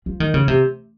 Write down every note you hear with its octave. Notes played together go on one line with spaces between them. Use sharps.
F3
D#3
C#3
C3